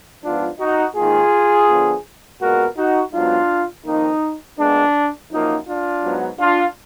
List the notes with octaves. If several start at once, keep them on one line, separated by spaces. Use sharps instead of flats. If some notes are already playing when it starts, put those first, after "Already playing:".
G#2 F3 B3 D4 F4
D#4 F#4
G#2 D#3 A#3 F4 G#4
D3 F3 B3
A#2 G#3 B3 F#4 A#4
D#4 F#4
G#2 F#3 B3 D4 F4
F2 D#3 A#3 D#4
A#2 G#3 B3 D4
F#2 F3 A#3 D#4
D4 F4
G#2 F#3 B3
D4 F4